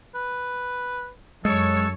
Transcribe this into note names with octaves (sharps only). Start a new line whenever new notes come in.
B4
F#2 G#3 A4 C#5 C#6